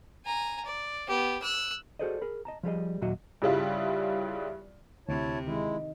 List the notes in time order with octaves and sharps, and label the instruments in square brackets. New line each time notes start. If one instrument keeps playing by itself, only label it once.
[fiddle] G#5 A#5
D5
B3 G4
E6 F#6
[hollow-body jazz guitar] F#4 G#4 A4 C5 D5 D#5
G#4 A#4 B5
D#5 A5 A#5
F3 G3 G#4 D#5
D#2 A#2 F#3 F#4 D#5 E5
[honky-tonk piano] G2 C#3 G3 E4 F4
[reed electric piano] D2 [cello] C3 [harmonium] E4 C#5 A5
[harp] D#3 [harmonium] G#3 E4